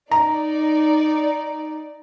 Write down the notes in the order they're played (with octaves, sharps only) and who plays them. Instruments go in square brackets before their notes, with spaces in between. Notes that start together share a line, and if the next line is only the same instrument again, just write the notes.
[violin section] D#4 D5 [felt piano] A#5